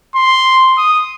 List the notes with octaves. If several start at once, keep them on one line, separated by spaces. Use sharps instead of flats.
C6
D#6